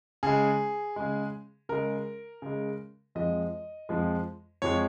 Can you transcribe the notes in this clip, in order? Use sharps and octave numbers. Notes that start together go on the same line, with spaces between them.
C#3 G#3 G#4
C#3 G#3
C#3 G#3 A#4
C#3 G#3
F2 F3 G#3 D#5
F2 F3 G#3
F2 F3 G#3 C#5